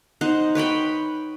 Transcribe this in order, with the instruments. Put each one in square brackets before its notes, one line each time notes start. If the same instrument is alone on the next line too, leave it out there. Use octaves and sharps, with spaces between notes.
[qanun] D#4 C5 F#5
B4 C#5 G5 B5